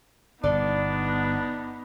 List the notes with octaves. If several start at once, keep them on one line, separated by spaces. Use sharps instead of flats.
G1 B2 B3 D4 D#4 D5